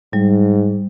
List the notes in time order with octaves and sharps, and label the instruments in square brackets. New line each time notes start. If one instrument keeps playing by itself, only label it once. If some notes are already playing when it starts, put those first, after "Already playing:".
[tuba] G#2 [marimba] G3